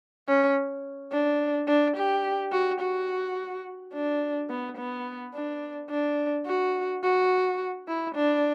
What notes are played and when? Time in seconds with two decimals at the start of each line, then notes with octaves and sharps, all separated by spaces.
0.28 C#4
1.12 D4
1.68 D4
1.97 G4
2.52 F#4
2.81 F#4
3.94 D4
4.50 B3
4.78 B3
5.35 D4
5.90 D4
6.46 F#4
7.03 F#4
7.88 E4
8.15 D4